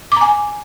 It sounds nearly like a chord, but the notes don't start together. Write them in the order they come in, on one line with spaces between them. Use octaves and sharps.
D6 A#5 G#5